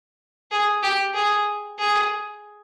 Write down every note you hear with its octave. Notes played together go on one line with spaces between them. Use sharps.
G#4
G4
G#4
G#4